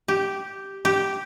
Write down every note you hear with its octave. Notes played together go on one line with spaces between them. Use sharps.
G4
G4